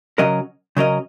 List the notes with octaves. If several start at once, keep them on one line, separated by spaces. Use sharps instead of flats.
C#3 F#3 C#4 A#4 D#5
C#3 F#3 C#4 A#4 D#5